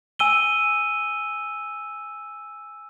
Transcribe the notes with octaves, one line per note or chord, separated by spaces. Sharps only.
G#5 E6 D#7 G7